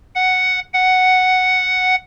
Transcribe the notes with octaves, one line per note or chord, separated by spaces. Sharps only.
F#5
F#5